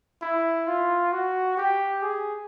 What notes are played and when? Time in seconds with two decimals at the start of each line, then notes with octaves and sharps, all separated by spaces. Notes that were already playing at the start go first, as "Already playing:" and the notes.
0.22 E4
0.67 F4
1.12 F#4
1.57 G4
2.02 G#4